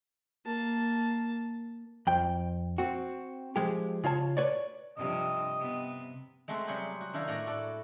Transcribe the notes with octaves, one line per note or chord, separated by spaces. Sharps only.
A#3 A5
F2 G5
C4 F#4
F3 G#3 G4
C#3 F4 C#5 A5
B4 C#5 D5
G2 C3 F3 D#5
C3 B3
G#3 A3 C4 F#4 A4 E5
C3 F#3 G3 G#4 C5 B5
F#4
D#3 D4 E4 A#4 F5
A2 D5 F#5 A#5
F#4 A4 D5